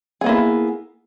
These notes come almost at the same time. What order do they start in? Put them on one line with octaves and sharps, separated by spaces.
G#4 B3 A#3 E4